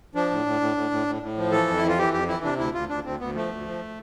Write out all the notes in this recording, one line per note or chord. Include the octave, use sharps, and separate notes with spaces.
F3 D4
A2
A2
A2
A2
A2
A2
A2
F3
E3 A4
F2
E4
E3
F4
E3 G4
F2 G4
E3 E4
C3 D4
D2 E4
D2 F4
D2 D4
D2 C4
D2 B3
F3 A3
D2
F3